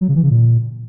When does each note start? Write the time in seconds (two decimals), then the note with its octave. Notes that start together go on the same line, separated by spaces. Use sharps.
0.01 F#3
0.08 C#3
0.16 E3
0.23 C#3
0.30 A#2